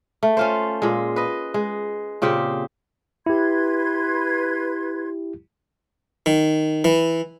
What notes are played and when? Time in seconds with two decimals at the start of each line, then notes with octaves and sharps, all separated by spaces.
0.23 A3
0.37 C#4 F4 C5
0.82 A#2 G#3
1.16 B4 D#5
1.54 G#3
2.22 A#2 C#3 C4 G4
3.26 E4 G4 B4 C6 G#6
6.26 D#3
6.84 E3